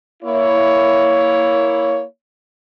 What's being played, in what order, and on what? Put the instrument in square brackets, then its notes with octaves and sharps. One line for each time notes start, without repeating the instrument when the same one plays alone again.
[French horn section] A#3 E4 C#5